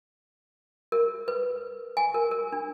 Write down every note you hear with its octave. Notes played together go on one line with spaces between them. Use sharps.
A#4
B4
G#5
A#4
A#4
D4